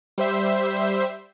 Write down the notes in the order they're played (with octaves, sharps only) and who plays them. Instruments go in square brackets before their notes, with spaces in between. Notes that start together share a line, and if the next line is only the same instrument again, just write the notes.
[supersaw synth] G3 C5 E5